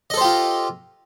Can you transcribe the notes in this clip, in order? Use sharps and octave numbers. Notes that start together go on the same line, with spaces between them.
F4 G4 A4 C5 D#5